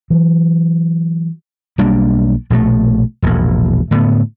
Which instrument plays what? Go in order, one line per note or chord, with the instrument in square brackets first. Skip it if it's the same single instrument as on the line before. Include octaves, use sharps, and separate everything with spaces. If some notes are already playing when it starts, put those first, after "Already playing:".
[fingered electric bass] E3 F#3
[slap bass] B1 G3 A#3 D4
A#1 B2 D3 A3
E1 A#1 E2 A2
A2 D3 B3